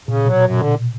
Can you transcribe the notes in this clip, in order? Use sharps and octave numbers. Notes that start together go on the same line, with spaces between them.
A#2 C#3
B2 F#3
F#2
D3